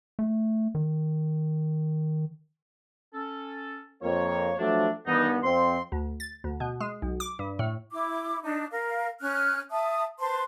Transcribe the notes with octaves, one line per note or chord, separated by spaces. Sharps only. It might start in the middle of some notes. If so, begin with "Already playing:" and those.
A3
D#3
C#4 A4
F2 A#3 C#5
F3 F#3 A3 D4
G2 D#3 E3 B3 D#4
F2 C4 C6
D2
A6
D2
B2
G#3
B1
D6
G2
A2
E4 D6
D4 D#4
A#4 F5
C#4 F6 F#6
E5 A5 D#6
B4 C5 A5 C6